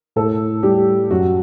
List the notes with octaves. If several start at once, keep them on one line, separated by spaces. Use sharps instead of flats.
A2 A4
G3 G4
F#2 F#4